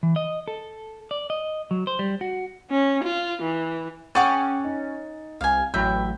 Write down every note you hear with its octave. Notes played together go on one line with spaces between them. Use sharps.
E3
D#5
A4
D5
D#5
F#3
C5
G3
F#4
C#4
F4
E3
C#4 G#4 F#5 G5 C#6 D6 A6
D#4
C2 F5 G#5
A1 F#3 E5 G5 B5 G6